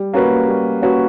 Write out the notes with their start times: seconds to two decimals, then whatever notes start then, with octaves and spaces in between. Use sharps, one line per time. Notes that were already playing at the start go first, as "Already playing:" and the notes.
Already playing: G3
0.14 A#3 C#4 F#4 B4
0.48 G3
0.82 A#3 C#4 F#4 B4